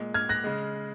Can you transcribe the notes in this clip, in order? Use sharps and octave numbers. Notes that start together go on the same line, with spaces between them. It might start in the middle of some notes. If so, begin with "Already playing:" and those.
Already playing: A#2 G#3
F6 G#6
F#6 A#6
C#3 G#3